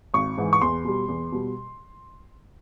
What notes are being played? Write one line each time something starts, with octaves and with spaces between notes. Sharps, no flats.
G#1 C#6
G#2 E3 G#3
C#6
E2 C6
B2 G3
E2
B2 G3